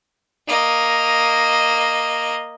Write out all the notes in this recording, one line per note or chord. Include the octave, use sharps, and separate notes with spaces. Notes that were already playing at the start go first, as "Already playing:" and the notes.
A#3 D#5